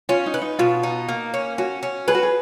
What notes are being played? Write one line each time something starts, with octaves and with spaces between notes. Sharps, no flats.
C#4 F4
D#4
B4
D#4
B2 F4
D#4
A#3
C#4
C#4 F#4
C#4
G#4 B4
F#4
G#4